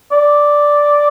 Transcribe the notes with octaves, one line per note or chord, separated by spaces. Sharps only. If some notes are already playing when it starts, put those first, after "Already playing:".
D5